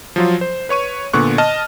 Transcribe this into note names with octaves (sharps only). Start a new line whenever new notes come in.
F3 F#3 F4
C5
B4 C#5 C#6 D#7
A#2 D3 B3 C#6 F#6
D#5 A5 F6